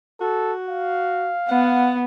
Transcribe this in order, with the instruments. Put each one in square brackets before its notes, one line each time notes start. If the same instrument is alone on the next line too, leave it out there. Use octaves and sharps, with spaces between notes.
[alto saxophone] F#4 [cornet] A4
[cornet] F5
[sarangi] B3 [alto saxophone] F#5